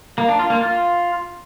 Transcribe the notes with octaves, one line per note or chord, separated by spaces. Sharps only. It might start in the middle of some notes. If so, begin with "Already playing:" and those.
A#3
D4
F4
A#3
F4